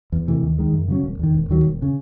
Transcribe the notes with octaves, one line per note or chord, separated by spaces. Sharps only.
E2
C3 E3 A3
D#2
D#3 G#3
F#2
C#3 F#3 C#4
E1
E2 D#3
E1
D#2 D#3 F#3
E1
C#3